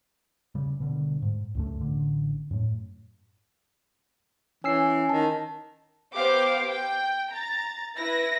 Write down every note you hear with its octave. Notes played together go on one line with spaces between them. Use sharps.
C#3 G3
B2 D3 G3
G#2
C#2 F#2 A3
A1 D3
F#2 A2
E3 C#4 G#5 E6 C7
D#3 A5
B3 G4 C5 F5 D6
G5
A#5 A6
E4 B4 A#6